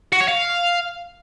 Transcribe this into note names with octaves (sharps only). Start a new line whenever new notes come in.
F#4
C#5
F5